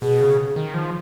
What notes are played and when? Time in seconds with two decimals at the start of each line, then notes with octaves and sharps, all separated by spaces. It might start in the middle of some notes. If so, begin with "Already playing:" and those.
0.02 B2 G#4
0.21 C#3
0.56 D#3
0.74 F3